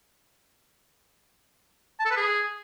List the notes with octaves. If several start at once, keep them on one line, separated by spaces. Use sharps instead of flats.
A5
A4
B4
G#4